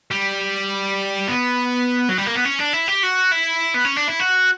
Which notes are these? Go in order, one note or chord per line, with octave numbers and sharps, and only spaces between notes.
G3
B3
F#3
G3
A#3
B3
C#4
D4
E4
G4
F#4
E4
B3
C#4
D4
E4
F#4